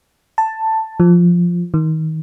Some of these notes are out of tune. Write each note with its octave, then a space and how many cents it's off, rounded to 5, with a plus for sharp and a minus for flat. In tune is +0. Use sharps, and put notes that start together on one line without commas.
A5 +10
F3 +0
D#3 +25